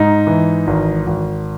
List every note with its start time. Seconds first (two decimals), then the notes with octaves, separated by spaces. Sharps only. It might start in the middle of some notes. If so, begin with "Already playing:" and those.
Already playing: G#2 D#4
0.27 E3
0.67 G#1
1.07 G#1